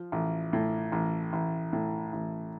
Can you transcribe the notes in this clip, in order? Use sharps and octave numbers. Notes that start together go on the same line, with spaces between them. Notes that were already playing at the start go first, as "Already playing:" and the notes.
Already playing: F3
A1
A2
A1
A1
A2
A1